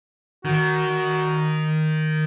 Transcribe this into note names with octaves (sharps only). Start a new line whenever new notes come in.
D#3 F#4